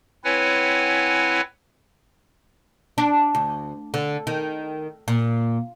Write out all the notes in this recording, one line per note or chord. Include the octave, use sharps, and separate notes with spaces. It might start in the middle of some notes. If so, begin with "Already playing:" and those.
C4 E4 B4 C#5 F#5 G#5
D4
D2
D3
D#3
A#2